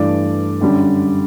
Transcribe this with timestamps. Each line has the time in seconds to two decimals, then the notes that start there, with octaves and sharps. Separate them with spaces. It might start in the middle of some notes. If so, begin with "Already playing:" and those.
Already playing: G2 E3 A3 D5
0.60 F#2 D3 G3